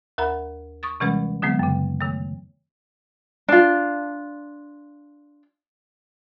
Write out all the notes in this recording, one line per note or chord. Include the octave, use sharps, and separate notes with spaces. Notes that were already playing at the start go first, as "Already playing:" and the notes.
D#2 A#4 F#5 A#5 B5
C#6 D#6 A6
C3 E3 G3 G#3 C#4 B4
D3 F#3 G#3 B3 C4
F#2 C#3
D#3 A3
D4 F4